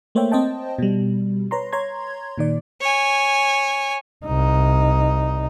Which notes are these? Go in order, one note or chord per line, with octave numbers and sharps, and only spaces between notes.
A3 A#3 C5 C#5 E5 G5
C4 C5 D#5 G5 A5
B2 G3
B4 C#5 A#5 C6
C#5 A#5 C6 G#6
A#2 D#3 D5
C#5 G#5
C2 D#4